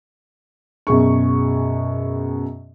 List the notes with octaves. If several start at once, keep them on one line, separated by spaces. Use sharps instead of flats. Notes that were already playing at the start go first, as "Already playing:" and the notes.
F#2 B2 G#4 C#6